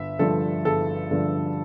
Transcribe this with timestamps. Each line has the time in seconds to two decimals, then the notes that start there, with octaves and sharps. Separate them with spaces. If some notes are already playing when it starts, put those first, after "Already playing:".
Already playing: G1 E5
0.19 G2 D3 F3 A4
0.65 G1 A4
1.11 G2 D3 F3